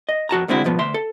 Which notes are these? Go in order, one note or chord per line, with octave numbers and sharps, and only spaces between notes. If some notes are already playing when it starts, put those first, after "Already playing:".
D#5
F2 F#4 A5 A#5
C2 D3 G#3 C4 E4 F#4
G#2 B2 F3 B3
D2 E5 C6
A4